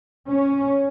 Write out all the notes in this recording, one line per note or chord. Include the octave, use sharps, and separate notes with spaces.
C#4